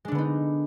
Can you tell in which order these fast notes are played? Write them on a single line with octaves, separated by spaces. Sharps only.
G#3 D4 D3 B3 D#4